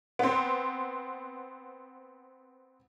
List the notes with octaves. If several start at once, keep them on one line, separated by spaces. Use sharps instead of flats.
B3 C4